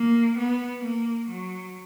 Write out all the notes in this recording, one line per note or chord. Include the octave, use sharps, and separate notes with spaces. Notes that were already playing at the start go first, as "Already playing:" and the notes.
Already playing: A#3
B3
A#3
F#3